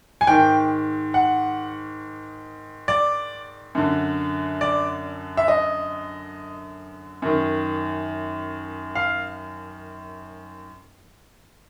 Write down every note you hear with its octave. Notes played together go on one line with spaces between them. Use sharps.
G#5
G#2 D#3 G5
F#5
D5
F#2 D3
D5
E5
D#5
F#2 D#3
F5